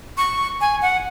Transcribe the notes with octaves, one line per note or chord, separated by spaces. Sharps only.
C#6
G#5
F#5